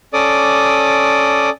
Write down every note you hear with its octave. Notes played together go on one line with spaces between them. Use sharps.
C#4 A4 D5 D6 D#6